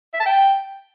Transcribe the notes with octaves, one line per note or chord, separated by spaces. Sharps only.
E5
A5
G5